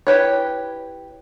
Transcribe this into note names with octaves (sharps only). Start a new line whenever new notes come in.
E4 G4 B4 C#5